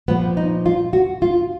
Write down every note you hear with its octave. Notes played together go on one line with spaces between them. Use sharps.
A#2 F3 B3
D#4
F4
F#4
F4